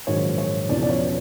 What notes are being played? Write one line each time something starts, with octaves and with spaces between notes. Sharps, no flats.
A#1 G#2 D#3 F#3 C#5
C#5
E1 E2 C#3 F3 D5
D5
C#5